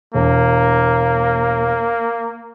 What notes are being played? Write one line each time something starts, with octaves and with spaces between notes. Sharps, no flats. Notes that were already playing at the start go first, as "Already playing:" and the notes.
E1 A#3